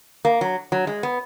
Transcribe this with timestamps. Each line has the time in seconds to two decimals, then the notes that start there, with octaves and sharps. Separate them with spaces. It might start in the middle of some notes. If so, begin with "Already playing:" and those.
0.25 A#3
0.41 F#3
0.72 F#3
0.87 G#3
1.03 B3